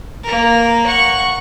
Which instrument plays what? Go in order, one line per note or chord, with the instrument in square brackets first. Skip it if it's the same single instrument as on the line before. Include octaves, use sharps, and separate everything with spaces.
[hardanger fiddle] A#3 A#4
F#5 C#6